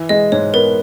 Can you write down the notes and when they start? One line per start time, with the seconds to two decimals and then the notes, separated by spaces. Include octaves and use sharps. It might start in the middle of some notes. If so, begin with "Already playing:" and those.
Already playing: E3
0.09 G#3 D#5
0.32 G#2 C#5
0.53 B3 A#4